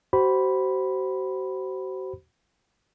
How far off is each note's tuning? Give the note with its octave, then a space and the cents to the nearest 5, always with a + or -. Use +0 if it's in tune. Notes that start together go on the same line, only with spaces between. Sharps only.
F#4 +40 C5 -5 B5 +0